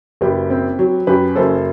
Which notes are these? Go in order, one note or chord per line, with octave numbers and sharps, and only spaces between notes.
F#1 G4 B4
C4
F#3
F#2 G4 B4
F#1 A4 C5